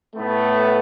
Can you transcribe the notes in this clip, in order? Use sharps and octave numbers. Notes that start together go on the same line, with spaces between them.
A2 A3 B3